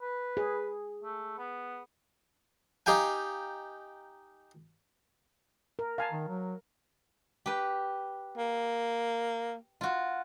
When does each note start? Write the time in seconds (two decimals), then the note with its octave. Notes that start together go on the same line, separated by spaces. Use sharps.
0.02 B4
0.37 G#4
1.03 A3
1.38 B3
2.86 D#4 G4 F5 G5 G#5
5.79 A#4
5.98 F5 G#5 A5
6.12 D#3
6.28 F#3
7.46 G4 B4
8.38 A#3
9.81 F4 F#4